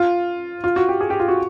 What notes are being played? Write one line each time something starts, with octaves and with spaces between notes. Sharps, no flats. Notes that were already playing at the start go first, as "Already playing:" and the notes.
Already playing: F4
F4
F#4
G4
G#4
G4
F4
F#4